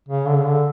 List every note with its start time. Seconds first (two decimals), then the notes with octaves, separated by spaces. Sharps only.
0.09 C#3
0.27 D3
0.37 C#3
0.46 D3